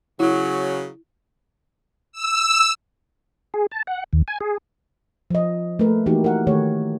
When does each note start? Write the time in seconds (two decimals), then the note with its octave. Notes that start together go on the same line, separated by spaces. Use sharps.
0.20 C#3 F#3 E4
2.12 E6
3.54 G#4
3.71 A5
3.87 F#5
4.13 D#2
4.28 G#5
4.41 G#4
5.30 F3 D#5
5.79 A3 A#3 A#4 B4
6.06 E3 A#3 D#4 F#4 G4
6.24 A#4 F#5
6.47 D#3 A3 G4 C#5